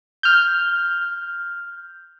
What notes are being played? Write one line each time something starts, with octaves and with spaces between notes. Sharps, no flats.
F6 G6